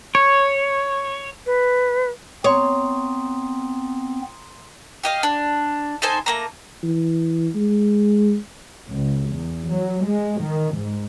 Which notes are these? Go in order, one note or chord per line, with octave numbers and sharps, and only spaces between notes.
C#5
B4
B3 C4 C#5 A#5 C6 D#6
G4 D#5 F5
D4
D#4 A4 C5 G#5
A3 A#3 A#5
E3
G#3
C#2
E2
F#3
G#3
D#3
G#2